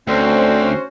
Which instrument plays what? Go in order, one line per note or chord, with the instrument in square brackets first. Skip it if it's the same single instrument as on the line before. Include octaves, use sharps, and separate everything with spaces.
[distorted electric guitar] D2 [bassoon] D3 [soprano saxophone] C4 [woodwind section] C#4 F#4 C5